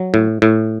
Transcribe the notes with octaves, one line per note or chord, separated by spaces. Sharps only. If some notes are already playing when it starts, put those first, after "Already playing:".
Already playing: F#3
A2
A2